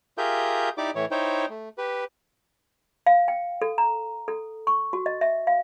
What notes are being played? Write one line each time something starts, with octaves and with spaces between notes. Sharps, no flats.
F4 G4 G#4 A#4 E5 G6
D#4 E4 G4 D5 D6
A2 E3 E4 C#5
D#4 E4 C5 C#5 G5
A3
G4 B4
F5
G5
A4
A#5
A4
C#6
F#4
D#5
E5
F5